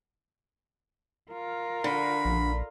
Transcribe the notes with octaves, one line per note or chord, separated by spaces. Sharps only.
F4 A#4
D3 B5
A#1